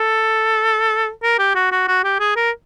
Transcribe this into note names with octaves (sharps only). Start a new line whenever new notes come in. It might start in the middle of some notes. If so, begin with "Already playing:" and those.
Already playing: A4
A#4
G4
F#4
F#4
F#4
G4
G#4
A#4